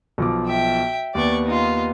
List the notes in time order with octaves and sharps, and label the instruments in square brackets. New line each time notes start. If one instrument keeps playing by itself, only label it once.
[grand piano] B1 F3 D6
[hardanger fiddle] E5 G5
[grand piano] D#2 B3 [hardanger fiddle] D5 C#6
[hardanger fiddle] D#4 F4